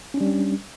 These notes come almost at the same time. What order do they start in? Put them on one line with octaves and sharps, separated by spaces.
C#4 D4 G3